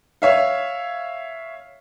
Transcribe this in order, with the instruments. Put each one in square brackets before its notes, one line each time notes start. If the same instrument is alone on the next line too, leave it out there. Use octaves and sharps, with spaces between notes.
[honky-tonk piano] C#5 E5 F5